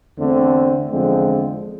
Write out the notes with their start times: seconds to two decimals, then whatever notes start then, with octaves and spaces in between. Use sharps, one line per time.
0.18 E2 D3 A3 C4
0.90 E2 D3 F3 G#3 C4